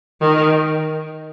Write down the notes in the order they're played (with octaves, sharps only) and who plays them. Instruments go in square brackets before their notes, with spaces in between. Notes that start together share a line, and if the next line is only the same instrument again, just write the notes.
[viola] D#3